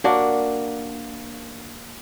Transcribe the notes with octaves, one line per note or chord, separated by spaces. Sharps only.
A#3 D4 F#4